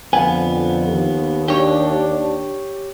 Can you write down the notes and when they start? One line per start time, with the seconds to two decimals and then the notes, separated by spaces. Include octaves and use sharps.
0.13 F2 D3 B3 F5 G#5
0.89 D#2
1.48 D4 G4 C#5